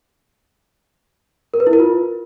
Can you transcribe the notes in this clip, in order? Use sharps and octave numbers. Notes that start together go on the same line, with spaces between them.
A#4
B4
E4
A#4
F4